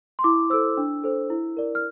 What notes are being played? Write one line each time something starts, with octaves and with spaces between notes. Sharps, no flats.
C6
E4 D6
A4 C5 E6
D4
A4 C5
E4
A#4 D5
F6